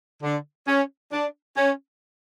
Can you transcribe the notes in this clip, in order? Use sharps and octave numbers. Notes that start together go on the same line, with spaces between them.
D3
C#4
D4
C#4